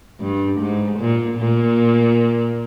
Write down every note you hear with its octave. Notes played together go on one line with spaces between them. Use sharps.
G2
G#2
A#2
A#2